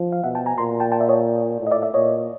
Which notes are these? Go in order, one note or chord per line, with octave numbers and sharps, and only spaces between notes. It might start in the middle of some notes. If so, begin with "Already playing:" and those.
Already playing: F3
F5
B2 E5 F#5
G5 A5
G#5 A#5
A#2 A#5 C6
G5 A5
G5 A5
D5 E5
C#5 D#5
A2
D#5
D5 E5
D5 E5
A#2 C#5 D#5